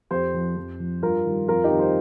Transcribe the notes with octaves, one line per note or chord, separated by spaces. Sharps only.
F2 G4 C5
F3
F2
F3
G2 F4 A#4
D#3 G3
F2 F4 A#4
D#4 G4
D#3 G3
G4 C5